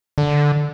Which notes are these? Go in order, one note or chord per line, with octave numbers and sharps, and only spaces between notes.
D3